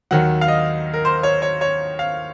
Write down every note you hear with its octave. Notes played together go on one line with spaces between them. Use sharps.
D#2 D#3 F#3 F#5
F5
D#5
A#4
C5
C#5
C#5
C#5
F5